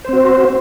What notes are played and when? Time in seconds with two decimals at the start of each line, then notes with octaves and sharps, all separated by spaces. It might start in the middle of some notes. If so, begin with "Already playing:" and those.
0.05 C5
0.09 C4
0.13 F#4